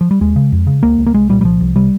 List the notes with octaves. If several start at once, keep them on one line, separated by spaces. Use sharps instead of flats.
F3
G3
D#2 G#3
C#3
F2
C#3
C#2 A#3
C#2
A#3
C2 G#3
A#2 G3
G3
C2 F3
C2
C3 G3